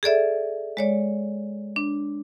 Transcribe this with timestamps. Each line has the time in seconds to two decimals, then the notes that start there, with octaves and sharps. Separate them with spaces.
0.03 G#4 A4 D5 E5
0.77 G#3 C#5 D5
1.76 D4